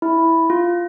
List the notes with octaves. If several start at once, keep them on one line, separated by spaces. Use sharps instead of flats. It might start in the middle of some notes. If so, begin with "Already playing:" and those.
E4
F4